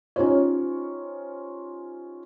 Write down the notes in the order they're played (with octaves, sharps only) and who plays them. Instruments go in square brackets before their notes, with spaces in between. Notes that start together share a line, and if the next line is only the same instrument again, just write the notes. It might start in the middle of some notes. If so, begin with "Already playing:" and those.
[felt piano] C#4 D#4 F4 G4 C5 C#5